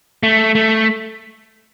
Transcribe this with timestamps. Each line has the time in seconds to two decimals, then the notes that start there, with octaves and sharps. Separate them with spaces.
0.23 A3
0.55 A3